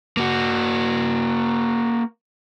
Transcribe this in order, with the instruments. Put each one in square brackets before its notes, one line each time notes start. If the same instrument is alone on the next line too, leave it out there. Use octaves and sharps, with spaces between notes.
[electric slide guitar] A#3 F#4